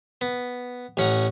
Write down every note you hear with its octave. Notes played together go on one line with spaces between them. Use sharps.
B3
A1 C#4 F#5 A#5